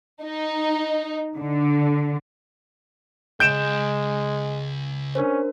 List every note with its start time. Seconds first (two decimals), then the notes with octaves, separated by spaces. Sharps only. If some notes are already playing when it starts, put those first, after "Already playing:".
0.25 D#4
1.37 D3
3.40 C#2 G#2 G#3 G6 D7 E7
5.15 C#4 D4 A#4 C5